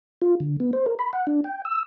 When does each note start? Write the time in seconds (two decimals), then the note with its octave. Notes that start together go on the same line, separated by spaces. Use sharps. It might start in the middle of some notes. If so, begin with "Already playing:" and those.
0.22 F4
0.40 D3
0.60 B3
0.73 C5
0.86 A#4
0.99 B5
1.13 F#5
1.27 D4
1.44 G5
1.65 E6